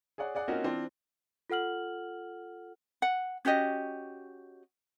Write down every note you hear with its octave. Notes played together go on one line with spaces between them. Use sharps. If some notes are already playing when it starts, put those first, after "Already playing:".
G#4 C#5 D5 F#5
G#4 D5 F#5
A#3 C4 C#4 D#4 F4 F#4
E3 C4 D4 F4
F4 A4 F#5 F6 F#7
F#5
C#4 F#4 G4 D#5